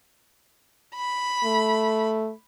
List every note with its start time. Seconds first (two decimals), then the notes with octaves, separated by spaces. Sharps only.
0.95 B5
1.44 A3